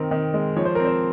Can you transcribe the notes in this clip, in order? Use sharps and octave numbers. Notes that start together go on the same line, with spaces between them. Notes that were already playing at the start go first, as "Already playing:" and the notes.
Already playing: D#3 C4 A#4
D#3
G#3
F3 C#5
C5
C4 A#4
C5